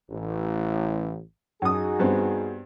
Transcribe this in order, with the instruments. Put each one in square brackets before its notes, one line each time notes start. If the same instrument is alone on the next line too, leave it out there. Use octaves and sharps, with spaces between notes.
[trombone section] A1
[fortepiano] F#2 D#6 [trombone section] D#4 F#4 G#4
[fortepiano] G2 B3 C4